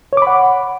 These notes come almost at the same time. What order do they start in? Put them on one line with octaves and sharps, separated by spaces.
C#5 D6 B5 F#5